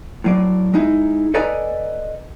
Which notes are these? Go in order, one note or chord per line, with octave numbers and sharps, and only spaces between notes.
A2 F#3 D5
G#3 D#4 E4
A4 B4 D5 D#5 G#5 A#5